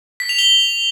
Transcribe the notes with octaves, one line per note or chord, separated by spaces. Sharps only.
B6
F7
G7